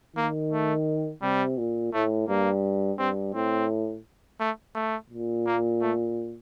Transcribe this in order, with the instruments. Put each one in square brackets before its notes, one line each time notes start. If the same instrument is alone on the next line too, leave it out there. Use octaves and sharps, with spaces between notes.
[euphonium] D#3 [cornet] A#3
[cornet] A3
[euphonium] C3 [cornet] G3
[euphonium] A#2
[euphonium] A2 [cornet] A3
[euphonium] G2 [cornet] A#3
[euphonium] G2 [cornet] C4
[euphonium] A2 [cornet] C4
[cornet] A3
A3
[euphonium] A#2
[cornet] A#3
A3